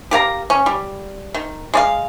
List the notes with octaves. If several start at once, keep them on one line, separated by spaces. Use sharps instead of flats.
G4 A#4 F5 A#5
C#4
G3
D#3
G#3 D5 F5